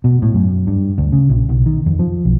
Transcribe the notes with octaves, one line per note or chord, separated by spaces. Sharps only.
B2
A2
F#2
G2
D2
C#3
A#1
B1
D#3
F2
F3
B1